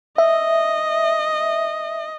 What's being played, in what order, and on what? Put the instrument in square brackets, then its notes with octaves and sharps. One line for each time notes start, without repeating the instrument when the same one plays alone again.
[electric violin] D#5 [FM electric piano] E5